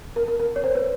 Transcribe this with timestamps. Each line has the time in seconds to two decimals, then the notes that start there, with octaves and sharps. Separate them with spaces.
0.16 A#4
0.28 A#4
0.40 A#4
0.56 C#5
0.64 C5
0.75 B4